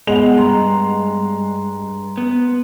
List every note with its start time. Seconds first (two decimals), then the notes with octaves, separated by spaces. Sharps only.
0.07 G#3 B3 F#5 F7
0.38 G2 A#5 C6
2.18 B3